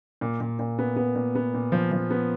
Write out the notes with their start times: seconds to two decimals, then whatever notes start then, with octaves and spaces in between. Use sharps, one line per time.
0.21 A#2
0.40 A#2
0.59 A#2
0.79 B3
0.96 B3
1.15 A#2
1.35 B3
1.54 A#2
1.72 F3
1.92 F3
2.10 B3